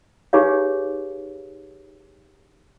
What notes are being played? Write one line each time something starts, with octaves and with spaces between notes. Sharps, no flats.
D#4 G4 G#4 B4 C#5 F5